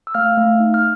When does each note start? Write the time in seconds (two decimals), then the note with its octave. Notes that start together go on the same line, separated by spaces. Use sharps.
0.07 E6
0.14 A3 F5 F6
0.37 A3
0.60 D#4
0.74 F6